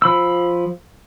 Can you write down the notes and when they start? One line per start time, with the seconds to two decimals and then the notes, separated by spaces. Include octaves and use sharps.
0.02 F3 B5 E6